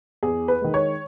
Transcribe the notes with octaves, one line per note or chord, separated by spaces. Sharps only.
E2 G#4
B4
D#3 G#3
C#5